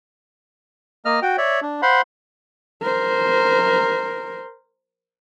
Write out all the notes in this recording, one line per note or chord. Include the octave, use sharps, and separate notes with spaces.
A#3 D#5 F6
F#4 G5
C#5 D5 E5
D4
C5 F5 F#5 B5 C6
A#4 C5